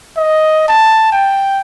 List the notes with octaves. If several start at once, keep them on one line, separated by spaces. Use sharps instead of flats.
D#5
A5
G5